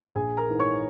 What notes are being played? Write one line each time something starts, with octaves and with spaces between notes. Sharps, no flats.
A#1 G#4 G#5
A#4 A#5
G#2 E3
C#5 C#6